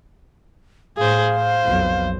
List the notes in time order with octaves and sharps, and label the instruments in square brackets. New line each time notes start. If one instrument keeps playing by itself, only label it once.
[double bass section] A2 [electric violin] G#4 C5 [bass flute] F5
[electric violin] C5
[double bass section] B1 F2